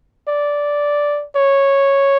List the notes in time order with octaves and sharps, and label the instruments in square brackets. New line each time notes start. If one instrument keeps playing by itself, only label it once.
[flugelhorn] D5
C#5